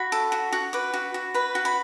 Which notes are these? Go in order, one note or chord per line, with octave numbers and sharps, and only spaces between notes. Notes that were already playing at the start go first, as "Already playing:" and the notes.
Already playing: F#4 B5
A4
F#4
F#4
B4 D6
F#4
F#4
B4 B5
F#4
B5